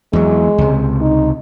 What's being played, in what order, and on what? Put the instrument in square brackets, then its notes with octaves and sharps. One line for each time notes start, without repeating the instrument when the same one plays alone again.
[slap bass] E2 F#3 [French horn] G#3
[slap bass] C#2 C3
[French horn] D#4